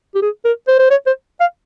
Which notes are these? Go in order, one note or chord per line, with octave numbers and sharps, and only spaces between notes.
G4
G#4
A#4
C5
C5
C#5
C5
F5